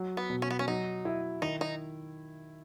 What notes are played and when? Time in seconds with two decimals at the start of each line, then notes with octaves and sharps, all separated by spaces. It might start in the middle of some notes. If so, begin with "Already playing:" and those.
Already playing: F#3
0.17 B3
0.30 B2
0.42 C#4
0.51 B3
0.59 C#4
0.67 F#3 D#4
1.05 E4
1.42 D#3 D#4
1.61 D#4